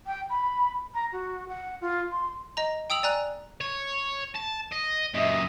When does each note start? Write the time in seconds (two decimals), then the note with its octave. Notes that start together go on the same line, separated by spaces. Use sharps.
0.07 G5
0.30 B5
0.94 A#5
1.12 F#4
1.49 F#5
1.81 F4
2.12 C6
2.57 D#5 A#5
2.90 G5 D#6 E6 F7 F#7
3.03 D5 G#5 A#5 F#6
3.61 C#5
4.36 A5
4.72 D#5
5.14 F#2 A#2 D#5 E5